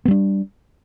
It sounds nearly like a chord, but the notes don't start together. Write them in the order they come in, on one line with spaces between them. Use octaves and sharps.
B3 G3 D4